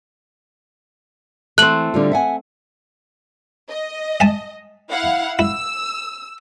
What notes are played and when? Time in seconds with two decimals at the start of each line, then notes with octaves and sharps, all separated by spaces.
1.58 E3 A3 C4 F#6 F#7
1.94 D3 G3 F4
2.12 E5 F#5 G#5
3.69 D#5
4.20 E5 G#5 A5
4.90 E4 F5 F#5
5.39 E4 E6